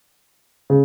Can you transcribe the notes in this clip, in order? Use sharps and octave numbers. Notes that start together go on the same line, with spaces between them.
C#3